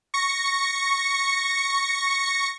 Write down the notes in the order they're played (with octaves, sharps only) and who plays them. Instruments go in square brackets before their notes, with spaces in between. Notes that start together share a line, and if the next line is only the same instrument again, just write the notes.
[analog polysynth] C#6 A#6 C#7